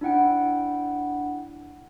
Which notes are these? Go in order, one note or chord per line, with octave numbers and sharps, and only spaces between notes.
D4 E4 F#5 G5